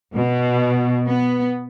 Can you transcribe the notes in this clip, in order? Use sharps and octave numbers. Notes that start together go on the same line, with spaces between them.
B2
B3